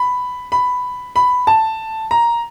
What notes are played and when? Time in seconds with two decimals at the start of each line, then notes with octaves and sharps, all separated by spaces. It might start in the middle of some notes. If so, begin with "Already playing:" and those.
Already playing: B5
0.52 B5
1.16 B5
1.47 A5
2.11 A#5